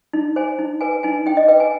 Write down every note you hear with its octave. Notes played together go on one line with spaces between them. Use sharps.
D#4
C5 G#5
D#4
B4 G#5
D#4 G#5
D#4 G5
D#5
B4 G5
G#5